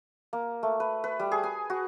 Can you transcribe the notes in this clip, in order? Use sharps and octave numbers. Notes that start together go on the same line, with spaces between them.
A#3
A3
B4
B4
G3
G#4
G#5
F#4